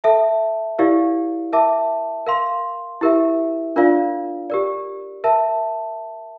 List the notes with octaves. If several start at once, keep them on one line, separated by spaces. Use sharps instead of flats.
A4 E5 A5
E4 G4 A#4 D5 F5
A#4 E5 A5 D6
A#4 F5 C6
E4 G4 A#4 E5
D4 F4 A#4 D5 F5
G4 A#4 D5
A#4 E5 A5